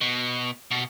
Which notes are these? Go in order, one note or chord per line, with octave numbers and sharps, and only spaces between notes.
B2
B2